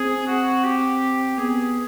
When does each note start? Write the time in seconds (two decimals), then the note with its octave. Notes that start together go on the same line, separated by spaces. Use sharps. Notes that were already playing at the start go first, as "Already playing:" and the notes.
Already playing: C4 G#4
0.27 F#4
0.64 G4
1.38 B3 G#4